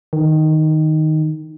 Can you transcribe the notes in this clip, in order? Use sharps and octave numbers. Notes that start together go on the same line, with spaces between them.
D#3